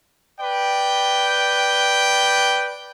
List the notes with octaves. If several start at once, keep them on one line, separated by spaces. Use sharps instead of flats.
B4 D5 G5